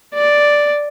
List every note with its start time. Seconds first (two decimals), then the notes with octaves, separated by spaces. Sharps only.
0.14 D5